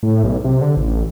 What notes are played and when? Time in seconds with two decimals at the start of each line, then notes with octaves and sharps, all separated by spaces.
0.03 A2
0.24 B1
0.44 C3
0.61 D3
0.77 A1